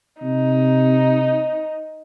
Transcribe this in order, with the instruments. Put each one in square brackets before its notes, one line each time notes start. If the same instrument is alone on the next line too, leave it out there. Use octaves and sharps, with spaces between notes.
[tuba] C3 [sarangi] D#4